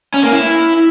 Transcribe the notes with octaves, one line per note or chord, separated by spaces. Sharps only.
C#4
A#3
E4